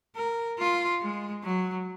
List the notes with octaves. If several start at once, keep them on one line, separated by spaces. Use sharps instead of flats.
A#4
F4
G#3
F#3